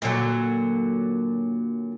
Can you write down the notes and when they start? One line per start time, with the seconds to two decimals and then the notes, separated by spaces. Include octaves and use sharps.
0.02 A#2 D3 F#3